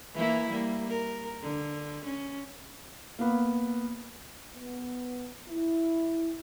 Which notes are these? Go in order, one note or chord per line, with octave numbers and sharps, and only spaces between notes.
E3 A#3 E4
G3 A#3
A#4
D3
C#4
A#3 B3
B3
E4